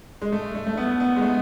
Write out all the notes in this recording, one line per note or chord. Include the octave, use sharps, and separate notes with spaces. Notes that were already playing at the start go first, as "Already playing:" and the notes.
G#3
A3
A3
A3
B3
B3
G#3
A3